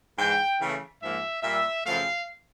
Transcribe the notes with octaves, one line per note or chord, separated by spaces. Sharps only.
G#2 E3 G#3 G5
C#3 E3 A3
G#2 F3 A#3 E5
A#2 G3 A#3 E5
F#2 C#3 F3 A3 C4 F5